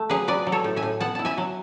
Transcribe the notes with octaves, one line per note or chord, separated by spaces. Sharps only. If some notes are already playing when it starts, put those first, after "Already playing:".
Already playing: A3
F#3 G#4 B4
F#3 B4 D5
F#3
A4 C#5
A2
E5 G#5
A2
B3 F#5 A5
E4 A5
E5 G#5
F#3